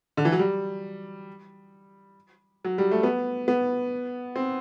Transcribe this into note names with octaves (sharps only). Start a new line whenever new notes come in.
D3
E3
F#3
G3
F#3
G3
A3
B3
B3
C4